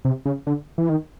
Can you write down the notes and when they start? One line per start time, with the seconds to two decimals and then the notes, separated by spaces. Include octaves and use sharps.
0.05 C3
0.25 C#3
0.47 D3
0.78 E3
0.89 D#3